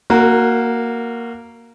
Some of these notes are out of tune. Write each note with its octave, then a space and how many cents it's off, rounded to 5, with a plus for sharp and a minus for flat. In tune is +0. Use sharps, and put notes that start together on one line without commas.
A#3 +0 F#4 +0 A#4 -35